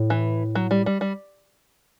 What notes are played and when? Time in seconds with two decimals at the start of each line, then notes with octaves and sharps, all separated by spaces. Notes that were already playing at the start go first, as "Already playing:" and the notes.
Already playing: A2
0.10 E3
0.55 F#3
0.71 G3
0.86 G3
1.01 G3